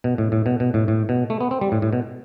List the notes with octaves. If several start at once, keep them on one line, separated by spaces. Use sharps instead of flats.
B2
A2
A2
B2
B2
A2
A2
B2
A3
B3
C4
G3
A2
A2
B2